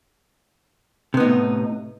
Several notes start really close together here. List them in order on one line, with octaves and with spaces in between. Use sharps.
C3 B3 D#4 A2